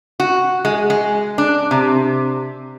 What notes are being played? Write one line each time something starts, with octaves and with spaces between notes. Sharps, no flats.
F#4
G#3
G#3
D4
C3